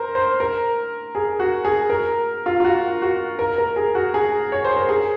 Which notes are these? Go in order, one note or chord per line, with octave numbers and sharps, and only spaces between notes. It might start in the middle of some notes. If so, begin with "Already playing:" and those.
Already playing: A#4 C5
C5
A#4
G#4
F#4
G#4
A#4
F4
F4
F#4
F#4
A#4
A#4
G#4
F#4
G#4
C#5
C5
A#4
G#4